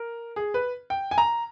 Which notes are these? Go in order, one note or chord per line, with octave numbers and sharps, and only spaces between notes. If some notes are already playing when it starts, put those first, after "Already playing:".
Already playing: A#4
G#4
B4
G5
G#5
A#5